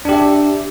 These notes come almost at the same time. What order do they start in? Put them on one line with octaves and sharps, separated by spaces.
D4 G4 E5